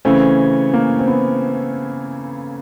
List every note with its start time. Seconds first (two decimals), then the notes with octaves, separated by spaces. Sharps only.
0.05 C#3 E3 A3 C4 C#4
0.73 A#3
0.99 C4
1.08 B3